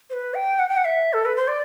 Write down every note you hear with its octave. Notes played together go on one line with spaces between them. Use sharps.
C5
B4
G5
F#5
G5
F#5
E5
A4
B4
C5
D5